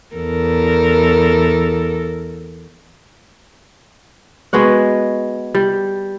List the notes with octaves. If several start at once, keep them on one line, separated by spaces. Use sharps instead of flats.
E2 A4 A#4
G#3 B3 F#4 F#5
G3